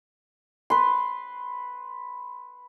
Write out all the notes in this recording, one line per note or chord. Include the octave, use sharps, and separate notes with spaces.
B4 C6